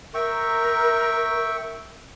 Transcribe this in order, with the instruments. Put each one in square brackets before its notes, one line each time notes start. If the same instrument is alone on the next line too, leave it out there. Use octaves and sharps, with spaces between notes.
[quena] A#4 [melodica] E5 G5 C#6